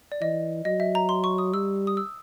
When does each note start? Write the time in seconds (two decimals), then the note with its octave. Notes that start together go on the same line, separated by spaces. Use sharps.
0.12 D5
0.21 E3 D#5
0.65 F#3 D#5
0.80 E5
0.95 A#5
1.09 C6
1.24 C#6
1.38 D#6
1.53 G3 E6
1.87 D#6
1.97 E6